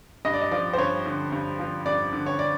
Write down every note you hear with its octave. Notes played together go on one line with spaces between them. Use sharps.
G2 D#5
D5
D#5
F3 D5
C5
G2 C#5
D3
G2
F3
G2 D5
D3
C#5
D5